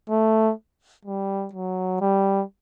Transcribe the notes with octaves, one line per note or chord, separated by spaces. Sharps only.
A3
G3
F#3
G3